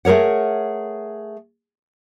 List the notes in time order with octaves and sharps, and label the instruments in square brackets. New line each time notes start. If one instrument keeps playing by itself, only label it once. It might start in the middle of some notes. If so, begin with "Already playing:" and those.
[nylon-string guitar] A3 G#4 A#4 C#5 F#5